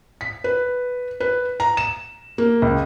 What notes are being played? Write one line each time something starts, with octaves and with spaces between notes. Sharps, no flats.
B6
B4
B4
A#5
E7
A#3
C#2